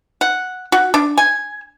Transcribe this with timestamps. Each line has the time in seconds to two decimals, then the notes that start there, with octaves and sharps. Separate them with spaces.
0.21 F#5
0.72 F#4
0.94 D4
1.18 G#5